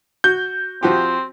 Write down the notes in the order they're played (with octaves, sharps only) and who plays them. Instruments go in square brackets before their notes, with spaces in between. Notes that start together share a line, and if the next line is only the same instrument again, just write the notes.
[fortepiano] F#4 [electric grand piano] G6
[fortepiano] F3 F#4 G4 [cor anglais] C4